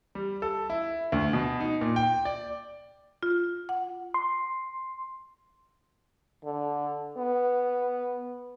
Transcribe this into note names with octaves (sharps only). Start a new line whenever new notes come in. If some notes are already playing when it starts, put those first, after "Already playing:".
G3
A4
E4
D2
B2
D#4
A#2
G5
D5
F4
F#5
C6
D3
B3